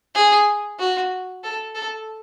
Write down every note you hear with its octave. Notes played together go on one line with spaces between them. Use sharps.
G#4
F#4
A4
A4